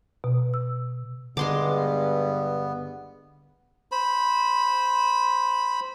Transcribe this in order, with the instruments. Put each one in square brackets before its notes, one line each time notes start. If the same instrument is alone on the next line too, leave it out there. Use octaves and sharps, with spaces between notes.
[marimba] B2
E6
[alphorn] G2 [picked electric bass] D3 [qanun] G#3 C6 D6 [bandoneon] B3
[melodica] C5 B5